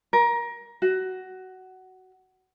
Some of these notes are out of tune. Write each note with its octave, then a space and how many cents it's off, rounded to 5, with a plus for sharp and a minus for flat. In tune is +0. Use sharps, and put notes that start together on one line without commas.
A#4 +20
F#4 +15